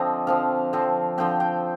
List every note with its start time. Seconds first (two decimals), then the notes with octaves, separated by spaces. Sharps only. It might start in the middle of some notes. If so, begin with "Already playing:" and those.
Already playing: D3 F3 C4 D#5
0.27 D3 F3 C4 F5
0.73 D3 F3 C4
1.18 D3 F3 C4 G5
1.40 G5